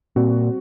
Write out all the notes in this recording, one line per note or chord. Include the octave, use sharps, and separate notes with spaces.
A#2 G3 C4 F#4